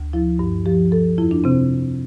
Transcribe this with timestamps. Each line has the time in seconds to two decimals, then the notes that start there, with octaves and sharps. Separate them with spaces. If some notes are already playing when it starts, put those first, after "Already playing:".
Already playing: D2
0.13 F3 E4
0.39 G2
0.66 F3 G4
0.91 F3 A4
1.18 F2 E4
1.31 D4
1.44 C3 C4